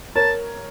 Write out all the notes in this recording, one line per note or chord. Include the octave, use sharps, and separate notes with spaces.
A#4 C#5 A5